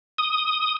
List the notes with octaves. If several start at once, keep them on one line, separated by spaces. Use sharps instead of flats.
D#6